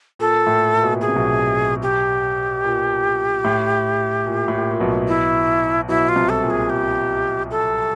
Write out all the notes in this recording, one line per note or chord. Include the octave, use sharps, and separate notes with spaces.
A#2 A4
A2
A#2
B2
A#2
B2 G#4
C3
B1 B2
G4
A#2
A2
A#2
A2
A#2
A#2
B1 B2
E4
B1 B2 E4
F4
C2 C3
A4
A#2
G#4
G4
A4